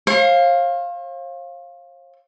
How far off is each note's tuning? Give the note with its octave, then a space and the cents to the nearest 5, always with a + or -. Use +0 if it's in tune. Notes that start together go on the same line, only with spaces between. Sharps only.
C5 +45 F5 +0